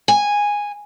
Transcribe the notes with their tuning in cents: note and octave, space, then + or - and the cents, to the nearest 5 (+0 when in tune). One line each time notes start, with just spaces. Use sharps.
G#5 -10